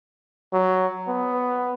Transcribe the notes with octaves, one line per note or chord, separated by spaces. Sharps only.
F#3
B3